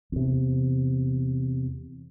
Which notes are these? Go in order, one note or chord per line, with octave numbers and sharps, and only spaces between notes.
E2 C3